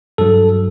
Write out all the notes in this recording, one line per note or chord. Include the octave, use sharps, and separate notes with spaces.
G2 F#3 A4